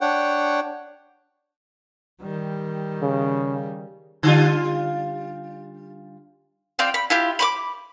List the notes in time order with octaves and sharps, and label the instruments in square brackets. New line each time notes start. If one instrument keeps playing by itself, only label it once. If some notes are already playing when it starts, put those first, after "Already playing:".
[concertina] D4 C#5 F#5 G5
[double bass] D#3 G3
[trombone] C#3
[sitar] D3 G3 F4
[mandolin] C4 F4 D5 G5
B5
E4 F4 G4
B5 C#6 D6